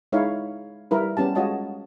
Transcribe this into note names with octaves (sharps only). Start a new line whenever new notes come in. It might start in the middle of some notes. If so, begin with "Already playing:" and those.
G#3 D#4 E4 C#5 F5
G3 E4 A#4 B4
G3 B3 C#4 G4 A5
G#3 F4 F#4 C#5 D#5 A5